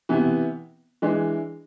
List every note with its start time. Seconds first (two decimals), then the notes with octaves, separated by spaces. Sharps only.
0.09 C3 E3 B3
1.02 E3 G#3 D4